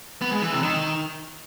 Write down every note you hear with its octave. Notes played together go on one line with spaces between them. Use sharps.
B3
G#3
E3
C3
D#3